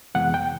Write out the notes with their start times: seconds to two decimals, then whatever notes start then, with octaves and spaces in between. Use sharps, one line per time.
0.15 F2 C3 E3 G#3 B3 F#5
0.34 G5